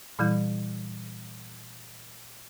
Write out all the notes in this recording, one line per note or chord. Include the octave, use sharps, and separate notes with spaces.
A#2 E3 G3 E4 G6